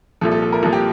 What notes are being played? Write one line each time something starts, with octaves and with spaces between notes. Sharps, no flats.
C2 A#2 F3 A4
A4
A4
A#4
C2 A#2 F3 A4
G4